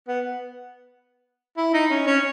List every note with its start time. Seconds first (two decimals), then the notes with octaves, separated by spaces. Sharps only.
0.08 B3
1.57 E4
1.74 D#4
1.91 C#4
2.07 C#4